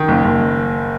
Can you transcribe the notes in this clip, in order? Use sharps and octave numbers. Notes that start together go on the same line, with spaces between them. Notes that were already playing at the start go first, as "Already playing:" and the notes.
Already playing: D#3
F#1
F#1